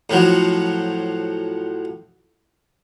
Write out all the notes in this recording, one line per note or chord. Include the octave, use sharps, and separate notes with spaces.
A2 F3 F#3